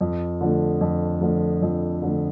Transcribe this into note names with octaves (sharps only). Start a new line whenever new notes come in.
F2
D3 F3 A3
F2
D3 F3 A3
F2
D3 F3 A3